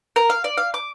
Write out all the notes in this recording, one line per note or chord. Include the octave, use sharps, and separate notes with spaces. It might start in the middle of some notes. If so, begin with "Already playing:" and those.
A#4
F5
D5
F5
D6